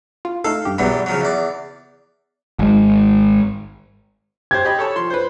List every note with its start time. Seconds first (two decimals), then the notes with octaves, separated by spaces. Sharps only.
0.25 F4
0.44 A3 D#4 A4 F5
0.65 G2 G4
0.78 B1 E2 F#3 G3 B3 B5
1.06 C#3 F3 F#3
1.21 E2 D5
2.59 G#1 G#3
4.51 G4 C5 G#6
4.65 G4 D#5 B5
4.79 A4 C#5 A5
4.96 F3 C6
5.10 B4 C5